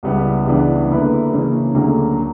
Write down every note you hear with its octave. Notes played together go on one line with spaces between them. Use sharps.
C#2 C#3 G3 B3 E4
C#2 C#3 E3 B3 D4
D3 A#3 E4 B4
C#3 E3 A#3 C#4
D2 D3 F#3 A#3 C#4